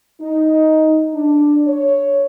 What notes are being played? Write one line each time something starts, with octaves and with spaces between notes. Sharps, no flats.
D#4
D4
C#5